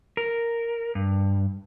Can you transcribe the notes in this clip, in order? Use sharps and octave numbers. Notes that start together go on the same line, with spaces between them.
A#4
G2